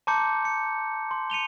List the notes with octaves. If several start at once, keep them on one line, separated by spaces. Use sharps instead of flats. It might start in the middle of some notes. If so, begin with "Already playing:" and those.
A5 A#5 C6 D6 G6 C#7
C#7
C6
C#7 D#7 F7 G7